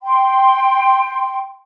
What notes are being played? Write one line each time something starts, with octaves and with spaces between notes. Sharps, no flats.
G5 C6